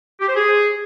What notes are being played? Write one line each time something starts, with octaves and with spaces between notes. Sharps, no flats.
G4
C5
G#4